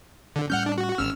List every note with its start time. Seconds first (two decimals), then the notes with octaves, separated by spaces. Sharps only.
0.36 D3
0.50 A2 G3 C#4 F#5 F6 G6
0.66 D4
0.78 F#4
0.98 G#1 C#4 E6 F6